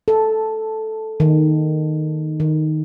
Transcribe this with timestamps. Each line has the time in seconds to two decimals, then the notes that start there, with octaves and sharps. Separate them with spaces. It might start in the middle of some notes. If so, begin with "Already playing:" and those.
0.08 A4
1.20 D#3
2.40 D#3